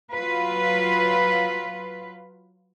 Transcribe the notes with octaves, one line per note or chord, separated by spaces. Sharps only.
F#3 F4 B4